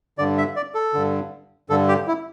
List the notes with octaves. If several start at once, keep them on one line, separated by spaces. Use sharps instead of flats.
G2 D3 D5
E5
D5
A4
G2 D3
G2 D3 A4
G4
E4